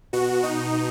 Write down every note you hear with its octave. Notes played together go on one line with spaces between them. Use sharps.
B2 F#4
B2 D#4